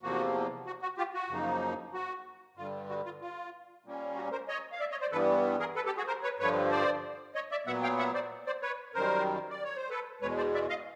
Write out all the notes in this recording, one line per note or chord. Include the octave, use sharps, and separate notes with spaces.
E2 C3 F3 A#3 F#4
F#4
F#4
F4 G4
F#4
F#2 C#3 F3 A#3 D#4
F#4
G2 D3 G3 F4
F#4
F4
F4
A#2 G3 A#3 C#4
F#4
A#4 C5
C#5 D#5
F5
D5 E5
C#5 D#5
C5 D5
G2 E3 G3 B3 A4 B4
G#4 A#4
A4 B4
G4 A4
F#4 G#4
A#4 C5
B4 C#5
G2 D3 F3 B4 C#5
C5 D5
C#5 D#5
D5 E5
A#2 F#3 B3 E5 F#5
F5 G5
E5 F#5
C5 D5
C5 D5
B4 C#5
F#2 D#3 G3 A#4 C5
D5
C#5
C5
A4 B4
E2 B2 G#3 B4 C#5
C5 D5
D5 E5
D#5 F5